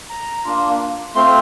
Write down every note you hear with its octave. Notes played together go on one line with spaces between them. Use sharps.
A#5
A#3 D4 F4
A3 C4 F4 C6